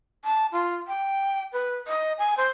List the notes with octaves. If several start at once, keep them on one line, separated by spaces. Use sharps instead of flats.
A5
F4
G5
B4
D#5
G#5
C5